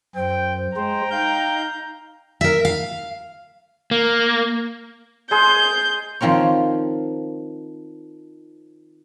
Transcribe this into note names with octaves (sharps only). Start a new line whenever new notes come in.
F#2 C5 G5
G#3 C5 G5 A#5
D#4 F5 G5 G6
A#4 E5
F5
A#3
G#3 G#4 C6 G6
D#3 F3 C4 A#4 C#5